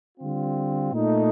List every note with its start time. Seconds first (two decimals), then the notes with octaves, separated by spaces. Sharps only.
0.18 D3 G3 C4 F4
0.92 A#2 A3 D#4